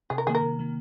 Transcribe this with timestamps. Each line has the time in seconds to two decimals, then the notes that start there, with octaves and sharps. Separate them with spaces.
0.10 C3 G#4
0.18 A#4
0.27 D#3 A#3 G#4
0.35 A#4
0.43 C3
0.59 D#3 A#3